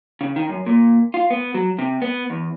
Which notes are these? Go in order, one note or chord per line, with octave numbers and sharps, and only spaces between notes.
C#3
D#3
F#2
A#2
F4
B3
F#3
C3
B3
E2